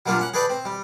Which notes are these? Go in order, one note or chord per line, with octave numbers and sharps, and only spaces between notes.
F#3 G3 A#3 D4 F4
C#4 F#5
G#4 A4 B4 D5 G5
C4
G3